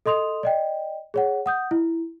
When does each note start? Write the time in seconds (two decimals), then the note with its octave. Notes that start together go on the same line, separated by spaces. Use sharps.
0.06 A4 D#5 C6 D#6 F7
0.43 D5 D#5 G5
1.14 G#4 C#5 F#5
1.46 F#5 D#6 G6
1.71 E4